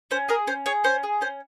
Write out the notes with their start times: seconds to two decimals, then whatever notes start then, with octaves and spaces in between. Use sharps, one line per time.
0.11 C#4 C5
0.29 G#4 A#4
0.47 C#4 C5
0.66 G#4 C#5
0.84 C#4 C5
1.03 G#4
1.21 C#4 C5